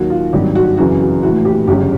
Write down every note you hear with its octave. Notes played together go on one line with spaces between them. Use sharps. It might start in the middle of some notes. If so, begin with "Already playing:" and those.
Already playing: D#2 D#3 F#3 A#3 F#4
F4
G#1 G2 D#3 F#3 G4
F#4
F#2 C#3 E3 F#4
F#4
A#1 A2 E3 A3 F#4
G4
G1 F#2 C#3 G4